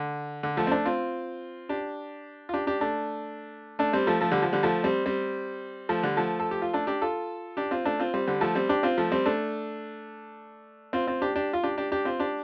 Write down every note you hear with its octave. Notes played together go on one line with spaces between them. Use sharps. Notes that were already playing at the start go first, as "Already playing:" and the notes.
Already playing: D3
D3
F3 A3
C4
A3 D4
C4 F4
D4 G4
F4
D4 G4
D4 G4
A3 D4
A3 D4
G3 C4
F3 A3
F3 A3
D3 G3
F3
D3 G3
F3 A3
G3 C4
G3 C4
F3 A3
D3 G3
F3 A3
A4
G4
F4
A3 D4
D4 G4
F4 A4
D4 G4
C4 F4
A3 D4
C4 F4
G3 C4
D3 G3
F3 A3
G3 C4
D4 G4
C4 F4
F3 A3
G3 C4
A3 D4
C4 F4
C4 F4
D4 G4
D4 G4
F4
D4 G4
D4 G4
D4 G4
C4 F4
D4 G4